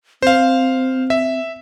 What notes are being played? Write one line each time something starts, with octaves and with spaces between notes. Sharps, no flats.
C4 C5 F5
E5